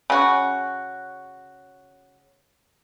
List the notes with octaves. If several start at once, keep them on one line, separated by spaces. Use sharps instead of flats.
C#3 F#4